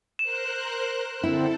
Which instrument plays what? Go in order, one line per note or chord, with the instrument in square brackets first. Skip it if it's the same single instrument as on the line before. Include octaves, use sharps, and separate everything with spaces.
[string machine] A#4 C5 F#6 [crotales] E7
[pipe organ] D3 C4 [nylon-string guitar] E4 [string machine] A4